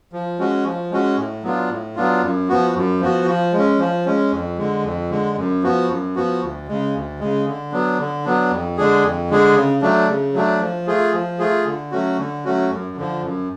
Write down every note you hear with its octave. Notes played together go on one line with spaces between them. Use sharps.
F3
G#3 C#4 F#4
F3
G#3 C#4 F#4
A2
F#3 B3 D4 F4
A2
F#3 B3 D4 F4
F#2
F3 B3 F#4
F#2
F3 B3 F#4
F3
G#3
C#4
F3
G#3 C#4
F2
D3 G#3
F2
D3 G#3
F#2
F3 B3 F#4
F#2
F3 B3 F#4
D2
C#3 G#3
D2
C#3 G#3
D3
F#3 B3 D4
D3
F#3 B3 D4
F2
D3 G#3 D4 G#4
F2
D3 G#3 D4 G#4
C#3
F#3 A3 D4
C#3
F#3 A3 D4
F3
A3 F4 G#4
F3
A3 F4 G#4
D3
F#3 A3 C#4 F#4
D3
F#3 A3 C#4 F#4
F#2
D3 F3
F#2